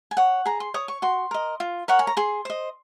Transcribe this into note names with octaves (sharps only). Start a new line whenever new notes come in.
G#5
C#5 F#5
G#4 A#5
C6
C#5 D#6
C#6
F#4 C6
A#4 D#5
F4
A#4 C#5 F#5
G#5
A#5
G#4 C6
C5 D#5